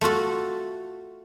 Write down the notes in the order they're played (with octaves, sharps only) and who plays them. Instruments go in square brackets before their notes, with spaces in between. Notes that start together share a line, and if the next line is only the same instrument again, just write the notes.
[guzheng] A3 F4 F#4 A4